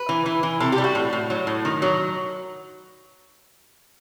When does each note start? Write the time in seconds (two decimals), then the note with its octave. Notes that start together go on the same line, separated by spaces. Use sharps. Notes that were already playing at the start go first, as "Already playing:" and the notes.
Already playing: B4
0.09 E3
0.26 E3
0.43 E3
0.60 C3 A4
0.72 G4
0.78 G3
0.84 F#4
0.95 A2
1.13 A2
1.30 F#3
1.47 A2
1.65 D#3
1.82 F#3